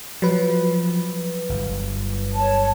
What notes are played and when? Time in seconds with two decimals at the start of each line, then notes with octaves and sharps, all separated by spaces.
0.22 F3 F#3 B4
1.49 G1
2.34 C#5 A5